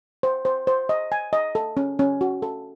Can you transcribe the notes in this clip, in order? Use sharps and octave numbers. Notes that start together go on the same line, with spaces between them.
C5
C5
C5
D#5
G#5
D#5
A4
C#4
C#4
F#4
A4